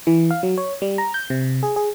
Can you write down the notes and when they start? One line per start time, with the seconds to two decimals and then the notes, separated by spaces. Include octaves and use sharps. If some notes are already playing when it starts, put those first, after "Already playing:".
0.07 E3
0.31 F5
0.43 F#3
0.58 C#5
0.82 G3
0.98 A#5
1.14 G6
1.30 C3
1.63 G#4
1.76 G#4